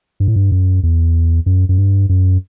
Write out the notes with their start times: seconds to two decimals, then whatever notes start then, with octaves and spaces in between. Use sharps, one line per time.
0.20 G2
0.28 A2
0.36 G2
0.52 F#2
0.83 E2
1.46 F#2
1.69 F#2
1.78 G2
2.09 F#2